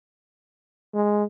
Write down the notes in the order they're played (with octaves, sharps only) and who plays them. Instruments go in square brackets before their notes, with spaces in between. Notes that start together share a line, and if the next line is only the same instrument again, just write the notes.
[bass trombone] G#3